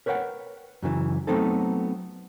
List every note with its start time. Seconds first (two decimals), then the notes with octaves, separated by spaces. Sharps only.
0.06 A#4 B4 C#5 D5 F#5 G5
0.82 F#2 C#3 E3
1.27 F#3 A3 B3 C4 D#4 A4